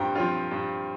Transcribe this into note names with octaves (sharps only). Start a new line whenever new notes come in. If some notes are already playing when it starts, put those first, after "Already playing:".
Already playing: G2 F3 C4 G5 A#5
F3 C4 F4
G2